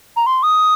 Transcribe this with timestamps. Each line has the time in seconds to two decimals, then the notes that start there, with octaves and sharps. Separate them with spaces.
0.16 A#5
0.26 C6
0.43 D#6